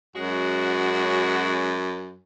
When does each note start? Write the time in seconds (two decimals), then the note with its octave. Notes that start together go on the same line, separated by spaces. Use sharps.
0.16 F#2 G#3 C#4 F#4